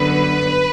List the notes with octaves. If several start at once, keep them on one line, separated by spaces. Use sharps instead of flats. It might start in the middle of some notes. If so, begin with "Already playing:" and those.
Already playing: G1 F#2 D3 F#3 B3 B4